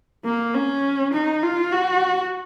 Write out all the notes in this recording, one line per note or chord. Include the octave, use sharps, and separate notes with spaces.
A#3
C#4
D#4
F4
F#4